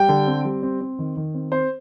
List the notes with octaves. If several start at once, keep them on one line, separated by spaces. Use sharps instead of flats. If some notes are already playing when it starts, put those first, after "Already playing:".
Already playing: G3 G5
D3
C4
G3
C4
C4
D#3
D#3
C4
C4 C5